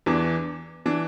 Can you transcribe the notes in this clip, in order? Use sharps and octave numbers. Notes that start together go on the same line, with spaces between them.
E2 E3 D4
E3 D4